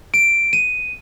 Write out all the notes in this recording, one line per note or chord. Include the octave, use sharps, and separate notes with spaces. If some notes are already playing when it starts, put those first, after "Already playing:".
D7
D#7